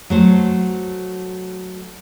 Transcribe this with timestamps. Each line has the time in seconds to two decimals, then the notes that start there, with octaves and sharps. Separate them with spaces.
0.10 F#3 A3 C5